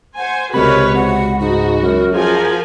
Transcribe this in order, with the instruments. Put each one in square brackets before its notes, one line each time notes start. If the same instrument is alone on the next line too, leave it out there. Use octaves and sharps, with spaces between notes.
[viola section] C5 G#5 [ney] F#5
[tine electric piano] C#2 G#3 B5 [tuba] C3 [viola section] F#4 B4 C#5 [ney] A#4
[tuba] C3 [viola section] F#4 [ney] F#5
[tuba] G#2 [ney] D#4 [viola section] F#4
[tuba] F#2 [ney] A#4
[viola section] F3 A#4 G#5 [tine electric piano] F4 G#4 [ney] F#4